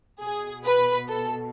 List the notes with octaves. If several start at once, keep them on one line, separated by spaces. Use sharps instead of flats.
B2 G#4
B4
A4